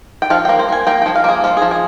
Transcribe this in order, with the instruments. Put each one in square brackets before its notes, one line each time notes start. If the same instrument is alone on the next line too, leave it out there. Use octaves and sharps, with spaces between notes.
[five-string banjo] G5
F3 F5
G5
A#3
C5
A#3 G#5
A#3 G5
G5
F3
F5
A#3 G#4
F3 F4
G#4
F3
G#4